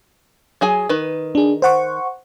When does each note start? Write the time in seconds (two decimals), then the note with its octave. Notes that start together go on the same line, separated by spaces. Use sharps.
0.61 F#3 G#4 G#5
0.89 D#3 B4
1.35 D4 G#4
1.62 C5 F#5 C#6